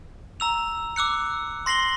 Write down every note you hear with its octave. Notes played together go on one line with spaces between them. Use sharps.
A#5 E6 F7
D6 E6 F#6 C#7
C6 A#6 C7 F#7 G7